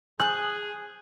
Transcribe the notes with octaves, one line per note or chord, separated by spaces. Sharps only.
G#4 C5 G#5 A5 F#6